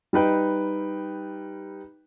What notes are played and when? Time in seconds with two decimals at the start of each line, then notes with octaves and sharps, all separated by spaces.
0.13 G3 D#4 B4 G5